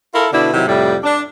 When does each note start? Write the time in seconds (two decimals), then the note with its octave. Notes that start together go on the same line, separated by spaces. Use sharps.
0.14 E4 F4 A4 A#4
0.32 B2 D3 D4 E4
0.53 C3 D#3 F#3 E4
0.67 F2 A2 C3 G3
1.04 D4